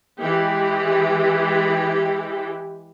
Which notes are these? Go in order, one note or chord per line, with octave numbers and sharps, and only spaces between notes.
E3 G#3 G4